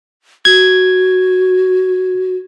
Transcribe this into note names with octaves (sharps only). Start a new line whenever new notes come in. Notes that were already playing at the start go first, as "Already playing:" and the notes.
F#4 G#6